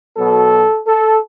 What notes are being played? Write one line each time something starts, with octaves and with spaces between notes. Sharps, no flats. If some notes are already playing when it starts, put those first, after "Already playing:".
B2 F#3 B3 A4
A4